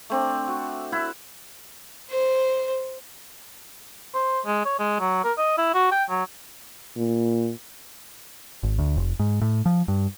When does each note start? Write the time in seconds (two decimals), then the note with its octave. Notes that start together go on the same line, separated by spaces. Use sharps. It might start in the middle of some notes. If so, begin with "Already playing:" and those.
0.10 A3 C4 D4
0.48 F#4
0.92 E4 E5 F#5
2.10 C5
4.14 C5
4.46 G#3
4.65 C#5
4.79 G#3
5.00 F#3
5.24 A#4
5.38 D#5
5.58 E4
5.74 F#4
5.92 G5
6.10 F#3
6.96 A#2
8.63 G#1
8.79 D2
8.96 F1
9.19 G#2
9.42 A2
9.66 F3
9.88 G2